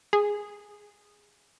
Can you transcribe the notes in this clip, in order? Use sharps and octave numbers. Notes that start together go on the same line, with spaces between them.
G#4